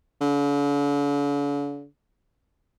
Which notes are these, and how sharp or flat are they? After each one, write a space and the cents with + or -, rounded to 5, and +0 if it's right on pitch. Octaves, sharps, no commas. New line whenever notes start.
D3 -45